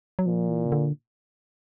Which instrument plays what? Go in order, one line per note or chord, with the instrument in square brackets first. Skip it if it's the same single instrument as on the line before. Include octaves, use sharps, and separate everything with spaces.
[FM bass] F#3
[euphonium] A#2 [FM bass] F3
[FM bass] E3
C#3
D3